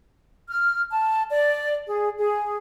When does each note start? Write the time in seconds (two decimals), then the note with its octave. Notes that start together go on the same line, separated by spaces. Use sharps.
0.50 F6
0.91 A5
1.30 D5
1.87 G#4
2.18 G#4